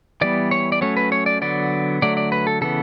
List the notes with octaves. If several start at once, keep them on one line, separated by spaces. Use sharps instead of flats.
E3 G3 B3 D5
C#5
D5
F#3 A3 C#4 C#5
B4
C#5
D5
D3 F#3 B3 D5
D3 F#3 A3 D5
D5
B4
A4
C#3 E3 B3 A4